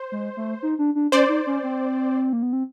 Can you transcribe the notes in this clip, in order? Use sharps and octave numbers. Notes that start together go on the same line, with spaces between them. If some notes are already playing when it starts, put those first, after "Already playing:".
Already playing: C5
G#3
A3
D#4
D4
D4
C#4 C5 D5
D#4
C#4
C4
A#3
B3
C4